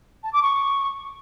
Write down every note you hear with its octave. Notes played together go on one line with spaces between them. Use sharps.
A5
D6
C#6